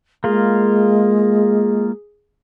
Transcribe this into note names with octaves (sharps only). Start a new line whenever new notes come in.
G#3 A#3 F4 G#4